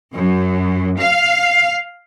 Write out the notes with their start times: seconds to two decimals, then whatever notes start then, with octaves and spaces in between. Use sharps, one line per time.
0.15 F#2
1.00 F5